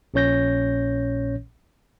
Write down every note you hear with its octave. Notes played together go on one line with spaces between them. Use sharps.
A#1 A#2 C#4 C#5 G6 A#6